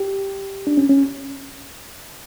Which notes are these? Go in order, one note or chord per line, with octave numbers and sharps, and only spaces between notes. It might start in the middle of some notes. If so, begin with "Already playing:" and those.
Already playing: G4
D4
C#4
C#4